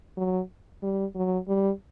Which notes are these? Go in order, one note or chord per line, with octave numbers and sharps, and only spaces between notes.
F#3
G3
F#3
G3